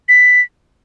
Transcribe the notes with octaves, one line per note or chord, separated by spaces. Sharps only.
B6